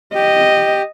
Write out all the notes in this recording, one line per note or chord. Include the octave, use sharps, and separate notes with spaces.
G4 D#5